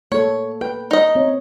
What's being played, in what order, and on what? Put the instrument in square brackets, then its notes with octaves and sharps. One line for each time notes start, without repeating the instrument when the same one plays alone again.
[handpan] A#3 A4 [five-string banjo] C#5
[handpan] B4 [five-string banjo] G5
[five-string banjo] D#4 D#5
[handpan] C4 C#5